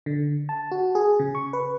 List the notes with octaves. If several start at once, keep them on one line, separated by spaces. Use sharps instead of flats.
D3
A5
F#4
G#4
C#3
C#6
B4